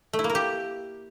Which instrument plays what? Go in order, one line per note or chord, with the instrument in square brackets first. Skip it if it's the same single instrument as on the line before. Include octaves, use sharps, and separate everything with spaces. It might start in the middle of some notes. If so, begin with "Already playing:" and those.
[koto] A3
E4
A#3
A#4
G4